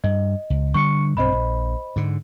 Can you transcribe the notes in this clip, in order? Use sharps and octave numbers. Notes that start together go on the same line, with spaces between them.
G2 D#5
C#2
D3 G3 D4 C#6 C#7
B1 G2 C4 C5 D#5 B5
A#1
G#2 D3